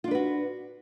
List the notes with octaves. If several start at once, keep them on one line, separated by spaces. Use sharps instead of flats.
D4 F4 F#4 B4